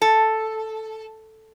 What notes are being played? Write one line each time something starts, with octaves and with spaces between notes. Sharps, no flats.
A4